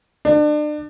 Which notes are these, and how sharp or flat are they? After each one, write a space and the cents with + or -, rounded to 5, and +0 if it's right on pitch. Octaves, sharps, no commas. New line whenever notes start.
D4 +35